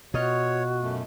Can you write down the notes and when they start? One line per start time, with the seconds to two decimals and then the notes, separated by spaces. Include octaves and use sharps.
0.14 B2 F4 F#4 C#5 D#5 F6
0.82 F#2 A3